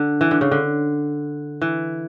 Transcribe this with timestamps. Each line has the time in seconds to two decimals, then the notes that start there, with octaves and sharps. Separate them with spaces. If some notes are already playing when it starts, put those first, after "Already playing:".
Already playing: D3
0.21 E3
0.31 D3
0.41 C#3
0.51 D3
1.62 E3